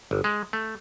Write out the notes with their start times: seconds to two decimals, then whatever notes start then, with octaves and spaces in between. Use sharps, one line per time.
0.11 G1
0.24 G#3
0.53 A3